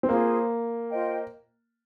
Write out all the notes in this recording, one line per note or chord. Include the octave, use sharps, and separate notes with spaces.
C4
A#3 F4 G#4 C5
F4 C5 D#5 G5